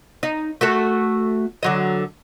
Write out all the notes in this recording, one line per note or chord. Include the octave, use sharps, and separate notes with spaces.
D#4
A3 F#4 A4
D3 F#3 D#5